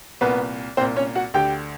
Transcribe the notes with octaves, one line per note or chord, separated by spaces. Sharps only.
C2 A#2 B3 B4
C2 A#2 C4 C5
C#4 C#5
F#4 F#5
D2 D3 G4 G5